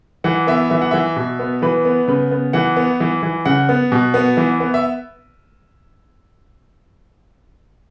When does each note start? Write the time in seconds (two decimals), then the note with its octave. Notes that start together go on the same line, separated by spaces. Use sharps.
0.24 E3 F#5
0.47 B3 E5
0.70 E3 E5
0.82 F#5
0.91 E3 E5
1.16 B2
1.39 B3
1.62 E3 B4
1.85 B3
2.08 C#3 B4
2.31 B3
2.53 E3 F#5
2.77 B3
3.00 E3
3.23 E3
3.45 C#3 F#5
3.69 B3
3.92 B2
4.14 B3
4.37 E3
4.60 B3
4.74 E5